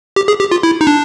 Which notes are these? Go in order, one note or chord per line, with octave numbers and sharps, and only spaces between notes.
G4
G#4
G4
F4
E4
D#4
D4